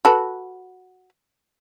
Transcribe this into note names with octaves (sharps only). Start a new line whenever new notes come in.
F#4 A4 B4